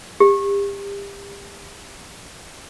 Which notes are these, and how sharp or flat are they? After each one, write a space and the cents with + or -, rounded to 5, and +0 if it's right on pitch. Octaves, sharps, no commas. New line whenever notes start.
G4 +30